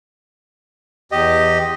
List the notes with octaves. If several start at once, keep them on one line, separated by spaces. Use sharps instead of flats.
E2 G4 D#5